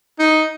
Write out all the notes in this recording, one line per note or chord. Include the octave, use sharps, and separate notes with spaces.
D#4